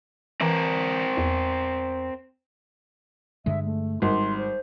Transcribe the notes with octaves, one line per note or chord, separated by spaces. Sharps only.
E3 C4 A#4
E2
G2 D3 G#3 E5
A3
G#1 G3 C6
C5